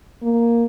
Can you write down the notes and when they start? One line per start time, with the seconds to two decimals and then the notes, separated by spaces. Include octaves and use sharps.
0.22 A#3